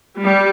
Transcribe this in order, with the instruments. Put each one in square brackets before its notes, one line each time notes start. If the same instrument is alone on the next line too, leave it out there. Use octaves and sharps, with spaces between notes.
[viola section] G3